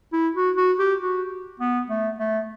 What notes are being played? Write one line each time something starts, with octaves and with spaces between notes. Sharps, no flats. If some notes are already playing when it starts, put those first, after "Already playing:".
E4
F#4
F#4
G4
F#4
B3
A3
A3